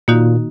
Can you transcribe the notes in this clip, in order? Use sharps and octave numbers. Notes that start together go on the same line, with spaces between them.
A#2 D#3 A#3 D#4 F#4